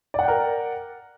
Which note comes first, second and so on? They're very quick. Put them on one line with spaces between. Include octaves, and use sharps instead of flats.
D5 F#5 G5 A#4